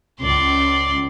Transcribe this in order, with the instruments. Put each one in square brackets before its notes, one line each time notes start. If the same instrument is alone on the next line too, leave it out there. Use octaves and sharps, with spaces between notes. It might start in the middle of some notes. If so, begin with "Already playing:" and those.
[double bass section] C#2 [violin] D5 C6